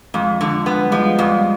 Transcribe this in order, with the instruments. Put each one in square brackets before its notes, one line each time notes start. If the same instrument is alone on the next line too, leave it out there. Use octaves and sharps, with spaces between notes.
[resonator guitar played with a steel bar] F2 [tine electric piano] G#3
[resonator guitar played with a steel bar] D3
B3
[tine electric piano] G3
[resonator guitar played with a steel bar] F3 [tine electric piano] G#3
[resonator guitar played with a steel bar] F2 [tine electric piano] G3